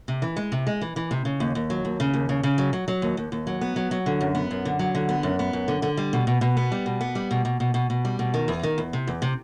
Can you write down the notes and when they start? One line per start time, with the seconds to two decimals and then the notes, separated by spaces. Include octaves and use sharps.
0.08 C3
0.22 E3
0.36 G#3
0.52 C3
0.67 G#3
0.81 E3
0.96 E3
1.11 C3
1.25 C#3
1.40 D#2
1.55 D#2
1.70 F#3
1.85 D#2
2.00 C#3
2.14 D#2
2.29 C#3
2.43 C#3
2.58 F#3
2.73 F#3
2.88 F#3
3.02 D#2
3.17 D#2
3.32 D#2
3.47 F#3
3.61 B3
3.76 F#3
3.91 F#3
4.06 D3
4.21 F#2
4.35 B3
4.51 F#2
4.65 D3
4.79 F#3
4.95 D3
5.09 B3
5.23 F#2
5.39 B3
5.53 F#2
5.68 D3
5.82 D3
5.97 G3
6.13 B2
6.27 B2
6.41 B2
6.57 B3
6.72 G3
6.86 B2
7.01 B3
7.15 G3
7.31 B2
7.45 B2
7.60 B2
7.74 B2
7.90 B2
8.05 G3
8.19 B2
8.34 D#3
8.48 E2
8.63 D#3
8.78 E2
8.93 C3
9.07 E2
9.22 C3